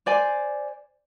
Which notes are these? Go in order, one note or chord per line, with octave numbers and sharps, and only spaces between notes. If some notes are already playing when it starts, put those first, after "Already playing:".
C5 D5 G#5